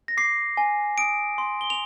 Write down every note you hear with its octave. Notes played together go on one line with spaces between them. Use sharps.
A#6
D6 C7
G#5
D#6 D7
C6
G7
F7